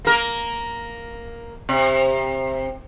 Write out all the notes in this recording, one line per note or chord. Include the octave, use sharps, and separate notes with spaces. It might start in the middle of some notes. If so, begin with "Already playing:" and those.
A#3 A#4
C3